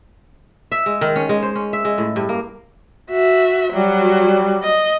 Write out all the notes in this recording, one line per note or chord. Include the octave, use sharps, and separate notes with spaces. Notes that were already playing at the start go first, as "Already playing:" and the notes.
E5
G#3
D#3
C#4
G#3
C5
C#4
E5
G#3
A2
G2
A#3
F#4 E5
F#3 G3 F#4
D#5